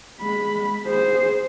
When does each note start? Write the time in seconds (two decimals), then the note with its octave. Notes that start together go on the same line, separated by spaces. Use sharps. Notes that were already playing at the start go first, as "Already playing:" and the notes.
0.21 G#3 B5
0.86 G#4 C5